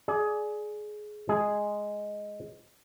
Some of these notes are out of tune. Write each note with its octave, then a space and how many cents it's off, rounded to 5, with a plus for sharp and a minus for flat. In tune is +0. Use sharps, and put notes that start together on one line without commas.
G#4 +20 D5 +0
G#3 +0 G#4 +0